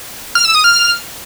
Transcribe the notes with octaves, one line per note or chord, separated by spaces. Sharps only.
F6
E6
D#6
F6